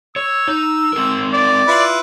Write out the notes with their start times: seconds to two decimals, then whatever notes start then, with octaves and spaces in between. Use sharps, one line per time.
0.16 C#5 E6
0.47 D#4
0.93 C4 G#4 A#4
1.34 D5
1.67 E4 F4 B4